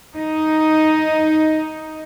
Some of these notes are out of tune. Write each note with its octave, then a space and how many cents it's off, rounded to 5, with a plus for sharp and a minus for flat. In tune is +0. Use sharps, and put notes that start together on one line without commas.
D#4 +5